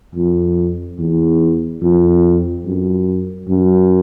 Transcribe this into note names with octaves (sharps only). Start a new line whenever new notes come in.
F2
E2
F2
F#2
F#2